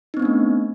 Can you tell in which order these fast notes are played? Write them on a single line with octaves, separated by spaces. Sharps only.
D#4 C4 B3 D4 A3